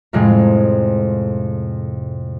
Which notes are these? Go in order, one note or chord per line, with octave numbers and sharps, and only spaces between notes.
F2 A2 C3 G#3